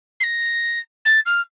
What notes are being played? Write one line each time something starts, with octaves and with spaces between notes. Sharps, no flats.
C7
A#6
A6
F6